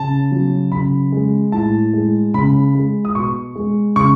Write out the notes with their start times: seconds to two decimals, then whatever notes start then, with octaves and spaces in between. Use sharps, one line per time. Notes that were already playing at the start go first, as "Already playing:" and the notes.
Already playing: C#3 A5
0.31 F#3
0.72 C#3 B5
1.12 G#3
1.52 A2 A5
1.93 G#3
2.34 C#3 B5
2.75 G#3
3.05 D#6
3.15 B2 C#6
3.55 G#3
3.96 C#3 C#6